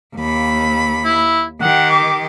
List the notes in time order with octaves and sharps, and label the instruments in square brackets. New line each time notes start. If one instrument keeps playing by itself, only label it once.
[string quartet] D#2 B5
[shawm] E4
[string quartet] D#3 G4 [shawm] F#5
[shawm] D6